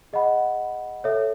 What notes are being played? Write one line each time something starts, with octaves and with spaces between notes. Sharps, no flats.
G#4 D#5 F#5 B5
A4 C#5 E5